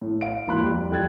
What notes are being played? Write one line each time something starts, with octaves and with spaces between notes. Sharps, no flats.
A2
F5 D7
G#1 E3 A#3 B5 C6 F#6
F2 G3 F4
F2 A4 G5 F#6 G#6 A6